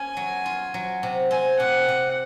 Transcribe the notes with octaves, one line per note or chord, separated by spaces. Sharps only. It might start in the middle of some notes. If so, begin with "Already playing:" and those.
Already playing: C#4 G#5
F#3
F4
F#3
C3
C4 G#5
C3 F#5
C3